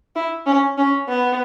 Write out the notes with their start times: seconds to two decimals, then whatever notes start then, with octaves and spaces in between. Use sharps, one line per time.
0.16 E4
0.46 C#4
0.78 C#4
1.09 B3